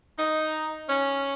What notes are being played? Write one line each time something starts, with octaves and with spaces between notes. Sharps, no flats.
D#4
C#4